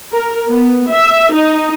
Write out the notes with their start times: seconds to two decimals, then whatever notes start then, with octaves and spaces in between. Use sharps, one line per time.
0.12 A#4
0.48 B3
0.90 E5
1.33 D#4